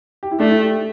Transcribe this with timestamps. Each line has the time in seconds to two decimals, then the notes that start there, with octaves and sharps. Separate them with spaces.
0.23 G4
0.31 E4
0.40 A3 D4
0.50 E4
0.62 G4